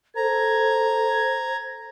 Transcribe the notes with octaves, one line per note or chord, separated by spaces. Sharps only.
A4 C5 A#5 G#6